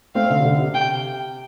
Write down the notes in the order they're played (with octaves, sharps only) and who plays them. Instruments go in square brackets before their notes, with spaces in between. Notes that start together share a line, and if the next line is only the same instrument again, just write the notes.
[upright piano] A3 C4 [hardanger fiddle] F5
[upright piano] D3
C3
D3
C3
[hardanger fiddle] G5